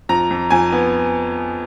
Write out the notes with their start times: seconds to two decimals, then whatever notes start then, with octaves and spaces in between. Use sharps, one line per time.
0.09 F2 A#5
0.31 F2
0.51 F2 G#5
0.72 B3